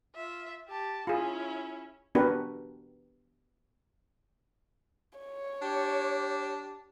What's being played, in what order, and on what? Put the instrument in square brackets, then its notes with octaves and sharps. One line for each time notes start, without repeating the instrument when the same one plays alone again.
[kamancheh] F4 E5
G4 A5
[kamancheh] C#4 E4 [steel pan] F4 G#4
[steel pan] B3 D4 F#4 G4 A#4 B4
[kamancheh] C#5
[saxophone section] D4 G4